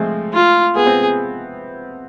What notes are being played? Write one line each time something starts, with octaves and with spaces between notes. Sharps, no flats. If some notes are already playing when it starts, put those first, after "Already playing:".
Already playing: F3 G#3 A3 C4
F4
B3 G#4
C4